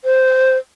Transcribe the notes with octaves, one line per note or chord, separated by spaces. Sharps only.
C5